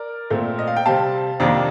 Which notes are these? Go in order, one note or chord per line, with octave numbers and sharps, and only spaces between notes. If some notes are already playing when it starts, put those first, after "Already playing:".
Already playing: A#4 D5
A#2 A3 C4
D#5
F5
G5
C3 G3 C4 F5 A5
F2 C3 D#3 A#3 D4